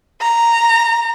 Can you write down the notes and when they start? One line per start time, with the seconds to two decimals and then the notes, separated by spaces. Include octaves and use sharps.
0.21 A#5